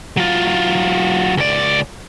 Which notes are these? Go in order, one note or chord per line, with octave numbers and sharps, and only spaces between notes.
F#3 F4
C#2 D5